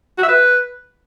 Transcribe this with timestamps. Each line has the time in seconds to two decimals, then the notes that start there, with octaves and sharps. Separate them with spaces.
0.18 F#4
0.23 E5
0.28 B4